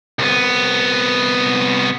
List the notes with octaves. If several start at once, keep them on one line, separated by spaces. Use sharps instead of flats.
C2 B3